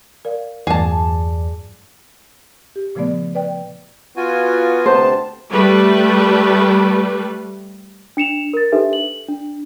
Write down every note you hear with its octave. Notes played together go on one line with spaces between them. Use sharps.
A#4 D5 F5
E2 G2 F#3 A3 G#4 D5 A5
G4
A#2 C#3 F3 A3 B3 D5
B4 D5 G5
B3 F4 F#4 G#5
D2 C3 C5 A5
G3 A3 B4
D4 C#7 E7 F7
A#4 A6
D4 D#4 G4 A4 B4 E5
F#7
D4